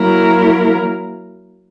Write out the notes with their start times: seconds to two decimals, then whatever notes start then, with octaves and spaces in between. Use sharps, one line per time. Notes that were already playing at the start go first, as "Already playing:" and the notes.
Already playing: F#3 A#3 E4 A#4